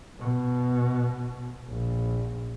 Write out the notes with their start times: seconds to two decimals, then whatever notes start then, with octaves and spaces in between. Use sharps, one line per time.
0.20 B2
1.69 A#1